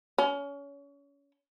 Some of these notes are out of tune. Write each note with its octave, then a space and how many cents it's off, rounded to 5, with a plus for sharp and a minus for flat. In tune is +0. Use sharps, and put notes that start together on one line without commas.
C#4 +30